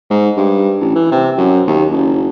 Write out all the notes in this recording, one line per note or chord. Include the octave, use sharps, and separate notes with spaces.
G#2
G2
A1
E3
C3
F#2
D#2
F#1